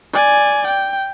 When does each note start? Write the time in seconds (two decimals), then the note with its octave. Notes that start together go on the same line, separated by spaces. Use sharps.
0.13 D5 G#5
0.67 G5